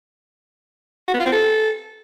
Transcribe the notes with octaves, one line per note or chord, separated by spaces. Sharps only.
F#4
B3
F4
C4
A4